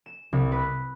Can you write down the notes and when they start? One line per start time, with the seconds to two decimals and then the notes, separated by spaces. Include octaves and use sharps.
0.06 E7
0.33 C2
0.52 B4